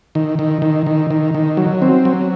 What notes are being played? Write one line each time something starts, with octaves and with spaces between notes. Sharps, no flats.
D#3
D#3
D#3
D#3
D#3
D#3
F#3
C4
F#3